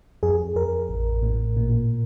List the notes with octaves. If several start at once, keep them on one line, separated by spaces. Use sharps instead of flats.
F2 G#4
F2 A#4
A1
A2
A#2